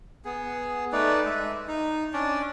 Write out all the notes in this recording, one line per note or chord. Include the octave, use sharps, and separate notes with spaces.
B3 G#4
A3 D#4 B4 D5
G#3 E5
D#4
C#4 D4 D5